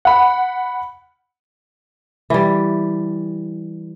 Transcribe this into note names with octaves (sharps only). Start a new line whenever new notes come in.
F#5 B5
E3 G3